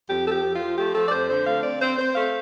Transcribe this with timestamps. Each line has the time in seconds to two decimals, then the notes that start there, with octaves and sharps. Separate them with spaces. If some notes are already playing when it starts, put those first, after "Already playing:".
0.09 F2 G4
0.27 F3 A4
0.31 G4
0.44 F2
0.55 F4
0.60 F3
0.77 A3 G4
0.94 F3 A4
1.06 D5
1.12 F2 C5
1.29 D3 C5
1.47 A3 F5
1.63 C4 D5
1.81 C4 C5
1.98 C4 C5
2.15 A3 F5